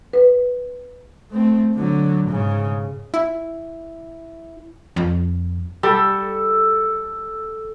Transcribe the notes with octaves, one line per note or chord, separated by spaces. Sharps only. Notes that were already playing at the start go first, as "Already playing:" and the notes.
B4
A3 C4
D3 F#3
G#2 C#3
E4
F2
G3 A4